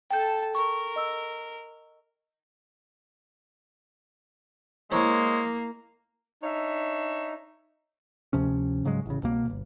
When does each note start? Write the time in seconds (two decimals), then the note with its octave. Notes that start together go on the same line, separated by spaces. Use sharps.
0.11 A4 G5 A5 G6
0.55 A#4 C#6
0.96 D#5 E6
4.92 G#3 A#3 E4 C5 C#5 A#5
6.42 D4 D#4 C#5 E5
8.33 D2 C3 F3 C#4
8.84 G#2 C#3 F#3 G#3
9.06 A1 C#3
9.23 C2 B2 A#3
9.46 D1 G1